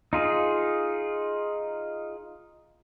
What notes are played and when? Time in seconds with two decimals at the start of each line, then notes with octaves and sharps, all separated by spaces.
0.13 D#4 F4 G#4